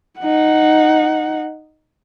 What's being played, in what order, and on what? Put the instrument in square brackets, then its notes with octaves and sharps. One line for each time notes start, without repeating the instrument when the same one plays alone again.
[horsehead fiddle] D#4 F#5